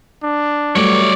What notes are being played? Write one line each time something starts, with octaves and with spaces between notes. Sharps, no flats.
D4
F#3 G3 A3 C#5 D5